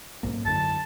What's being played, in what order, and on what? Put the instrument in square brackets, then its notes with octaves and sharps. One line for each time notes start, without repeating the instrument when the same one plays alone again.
[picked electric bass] B1 G#2 A#3
[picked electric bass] F#2 D3 [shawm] A5